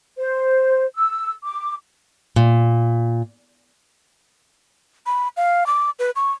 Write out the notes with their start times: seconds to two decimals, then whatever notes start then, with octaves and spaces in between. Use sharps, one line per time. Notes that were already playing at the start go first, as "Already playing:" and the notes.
0.17 C5
0.95 E6
1.44 D6
2.36 A#2
5.06 B5
5.37 F5
5.66 D6
5.99 B4
6.16 C#6